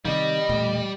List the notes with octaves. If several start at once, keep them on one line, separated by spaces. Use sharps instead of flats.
C3 D#3 G3 D#5
E1 A#2 A3